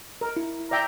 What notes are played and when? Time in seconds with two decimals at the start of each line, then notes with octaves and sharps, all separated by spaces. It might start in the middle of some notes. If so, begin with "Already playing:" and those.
0.21 A#4
0.37 E4
0.71 D5 E5 G5 A#5